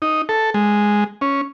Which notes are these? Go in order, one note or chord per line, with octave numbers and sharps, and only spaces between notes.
D#4
A4
G#3
C#4